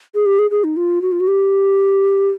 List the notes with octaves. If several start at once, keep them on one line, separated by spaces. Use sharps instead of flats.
G#4
G4
G#4
G#4
D#4
F4
F#4
F4
F#4
G4